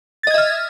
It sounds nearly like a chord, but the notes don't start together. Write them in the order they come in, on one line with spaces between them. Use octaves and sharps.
A6 D#5 G#6 E5 F6